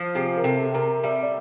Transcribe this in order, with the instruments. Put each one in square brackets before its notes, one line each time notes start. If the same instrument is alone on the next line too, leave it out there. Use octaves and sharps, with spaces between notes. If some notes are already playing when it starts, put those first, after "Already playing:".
Already playing: [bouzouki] F3
[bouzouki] C3 [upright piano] G#4
[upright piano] A#4
[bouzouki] C3 [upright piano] A4
[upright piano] A4
[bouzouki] C3 [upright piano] A#4
[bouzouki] G3 [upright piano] E5
[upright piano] D5